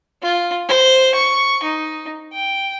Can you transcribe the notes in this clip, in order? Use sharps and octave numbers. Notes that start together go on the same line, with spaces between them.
F4
C5
C#6
D#4
G5